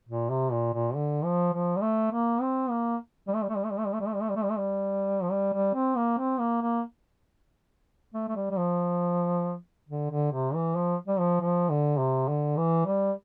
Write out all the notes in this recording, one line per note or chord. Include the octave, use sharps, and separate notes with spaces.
A#2
C3
A#2
A#2
D3
F3
F3
G3
A3
A#3
C4
A#3
G3
A3
G3
A3
G3
A3
G3
A3
G3
A3
G3
A3
G3
A3
G3
A3
G3
A3
G3
F3
G3
G3
C4
A#3
C4
A#3
A#3
A3
A3
G3
G3
F3
D3
D3
C3
E3
F3
G3
F3
F3
D3
C3
D3
E3
G3